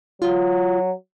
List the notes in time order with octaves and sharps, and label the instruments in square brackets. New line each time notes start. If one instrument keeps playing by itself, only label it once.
[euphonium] F#3 [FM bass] F4